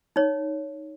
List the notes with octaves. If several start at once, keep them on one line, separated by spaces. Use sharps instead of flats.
D#4 C#5